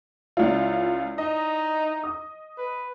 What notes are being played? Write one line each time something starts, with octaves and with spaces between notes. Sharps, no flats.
C#2 E4 F4 D5
D#4 D#5
D#6
B4